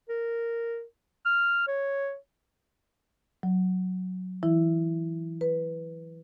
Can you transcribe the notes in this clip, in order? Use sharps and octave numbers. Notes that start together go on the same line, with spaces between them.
A#4
F6
C#5
F#3
E3 E4
B4